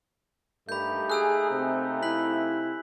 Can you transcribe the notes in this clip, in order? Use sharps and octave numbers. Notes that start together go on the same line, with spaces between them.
G2 A3 A#3 D#4 G4 B5 G6
G#4 G#5 E6 F#6
C3 C4
E4 F#6 B6 F#7